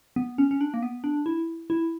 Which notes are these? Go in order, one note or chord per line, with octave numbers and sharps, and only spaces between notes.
B3
C#4
C#4
D4
A#3
B3
D4
E4
E4